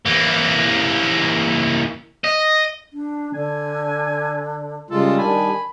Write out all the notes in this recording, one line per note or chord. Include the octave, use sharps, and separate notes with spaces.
E3 A#3
D#5
D4
D3 G#5
C#3 G3 G#3 F4 A4
D#3 D4 G#5 B5